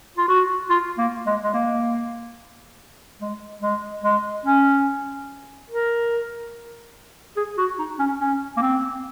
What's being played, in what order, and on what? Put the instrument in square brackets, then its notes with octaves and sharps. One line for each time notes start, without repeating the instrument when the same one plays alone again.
[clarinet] F4
F#4
F4
A#3
G#3
G#3
A#3
G#3
G#3
G#3
C#4
A#4
G#4
F#4
D#4
C#4
C#4
A#3
C4